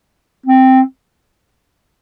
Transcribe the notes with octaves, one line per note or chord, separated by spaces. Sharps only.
C4